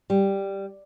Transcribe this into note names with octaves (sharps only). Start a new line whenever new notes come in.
G3